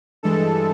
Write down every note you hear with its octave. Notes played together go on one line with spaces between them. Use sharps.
G2 E3 G#3 A4